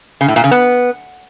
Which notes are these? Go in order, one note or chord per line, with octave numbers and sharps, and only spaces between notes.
C#3
A2
A#2
C#3
B3